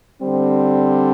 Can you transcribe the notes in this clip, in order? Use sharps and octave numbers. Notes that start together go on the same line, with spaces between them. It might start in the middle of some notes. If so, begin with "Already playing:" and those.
D3 G3 C4